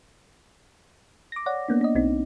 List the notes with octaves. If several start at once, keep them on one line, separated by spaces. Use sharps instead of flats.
D6 A#6
C#5 D5 F#5
A#3 B3 D4
D4 D#5
B1 C4 D#4